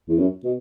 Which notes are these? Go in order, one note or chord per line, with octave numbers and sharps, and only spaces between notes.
E2
F#2
B2